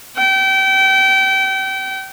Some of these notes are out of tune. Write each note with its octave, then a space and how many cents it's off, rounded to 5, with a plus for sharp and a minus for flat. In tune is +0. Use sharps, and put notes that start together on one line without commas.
G5 -30